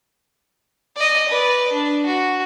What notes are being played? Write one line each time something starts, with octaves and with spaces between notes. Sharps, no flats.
D5 D#5
B4 D5
D4
F#4